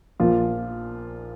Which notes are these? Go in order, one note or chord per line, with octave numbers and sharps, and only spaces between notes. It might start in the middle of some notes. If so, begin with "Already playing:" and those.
A#1 A#2 F3 F4